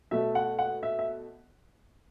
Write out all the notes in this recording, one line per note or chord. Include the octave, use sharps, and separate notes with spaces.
B2 A3 E5
F#5
F#5
E5
E5